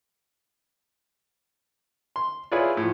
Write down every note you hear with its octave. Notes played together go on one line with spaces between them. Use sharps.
C6
E4 F4 G#4 B4 C#5 D5
A2 F3